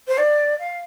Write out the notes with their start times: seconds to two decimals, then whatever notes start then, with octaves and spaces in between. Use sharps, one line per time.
0.08 C5
0.18 D5
0.59 F5